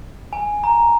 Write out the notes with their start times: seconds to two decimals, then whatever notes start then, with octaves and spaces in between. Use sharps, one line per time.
0.33 G#5
0.64 A#5